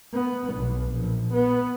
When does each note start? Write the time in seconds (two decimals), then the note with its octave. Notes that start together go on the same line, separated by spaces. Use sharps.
0.13 B3
0.54 B1
0.93 A#1
1.33 B3